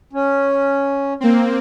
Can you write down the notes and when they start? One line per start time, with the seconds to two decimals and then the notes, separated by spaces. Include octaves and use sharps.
0.13 C#4
1.21 A#3 C4